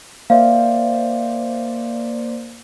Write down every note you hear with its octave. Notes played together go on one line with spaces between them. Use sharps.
A#3 C5 D5 E5 F5